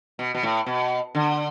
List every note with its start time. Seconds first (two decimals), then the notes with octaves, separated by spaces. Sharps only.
0.19 B2
0.35 B2
0.43 A2
0.66 B2
1.15 D3